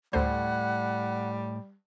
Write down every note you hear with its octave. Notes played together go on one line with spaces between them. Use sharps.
D2 A2 G3 A4 C5 F#5